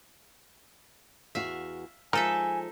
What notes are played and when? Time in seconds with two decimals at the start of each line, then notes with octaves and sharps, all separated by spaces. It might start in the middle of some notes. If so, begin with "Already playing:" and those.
1.35 E2 F#4 E5 F5
2.13 F3 G#3 D#4 A4 A#4 E5 G#5